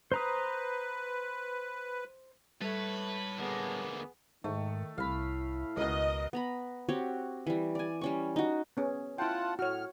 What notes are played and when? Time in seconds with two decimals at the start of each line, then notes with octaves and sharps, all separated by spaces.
0.12 B4 C5 A#5 D#6
2.62 G3 A3 A4 B4 C#5
3.39 D2 A#3 B3 G#4
4.44 G#2 D#3 A3
4.98 C2 A2 E4 F5 B5
5.77 C#2 B2 A#4 D#5
6.33 B3 A#5 B5
6.89 C4 F#4 G4 C#5
7.47 E3 G3
7.75 D5 G#5
8.01 G3 C#4 C#6
8.36 D#4 F#4
8.77 B3 C#4 G#4
9.18 E4 F4 F#5 G5 A5
9.59 A2 F#4 C#5 F6